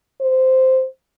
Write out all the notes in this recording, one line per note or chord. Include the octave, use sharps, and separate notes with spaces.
C5